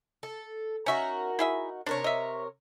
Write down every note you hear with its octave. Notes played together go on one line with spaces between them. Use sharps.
A4
C#4 D#4 F#4 A#4 E5
E4 G#4 E5
C3 D4 A#4 C#5
D#5 E5